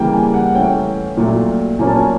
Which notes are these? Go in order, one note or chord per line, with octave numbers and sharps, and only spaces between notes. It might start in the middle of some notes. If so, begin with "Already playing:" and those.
Already playing: C#3 E3 G3 A#3 G5
G#5
F#5
E3 A3 C#4 G5
A#2 F#3 A3
A#2 F#3 A#3 C#4 G#5
A5
G#5